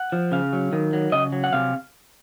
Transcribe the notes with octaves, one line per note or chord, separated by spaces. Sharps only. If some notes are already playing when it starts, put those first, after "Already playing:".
Already playing: F#5
F3
C#3 F5
F#3
D#3
F#3
C#3 D#5
F#3
F#5
C3 F5